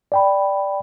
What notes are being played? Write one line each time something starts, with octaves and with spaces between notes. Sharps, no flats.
D5 G5 B5